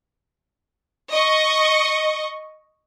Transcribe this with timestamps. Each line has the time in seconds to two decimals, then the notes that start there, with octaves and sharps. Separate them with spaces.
1.11 D#5 C#6